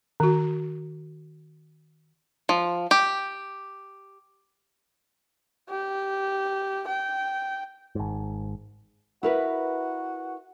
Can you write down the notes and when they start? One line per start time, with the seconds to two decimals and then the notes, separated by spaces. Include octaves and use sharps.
0.20 D#3 F#4
2.49 F3
2.91 G4
5.70 G4
6.88 G5
7.95 G#1 G#2
9.23 E4 F#4 A#4 B4